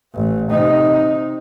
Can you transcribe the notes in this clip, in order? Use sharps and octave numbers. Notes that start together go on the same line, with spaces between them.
A1
C3 D#4